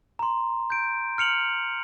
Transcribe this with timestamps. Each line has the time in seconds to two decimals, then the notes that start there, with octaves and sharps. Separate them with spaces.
0.19 A#5 C6
0.70 G6 D7
1.18 F6 C#7 F7 F#7